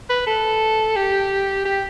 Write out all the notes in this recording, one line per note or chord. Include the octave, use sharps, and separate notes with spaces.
B4
A4
G4
G4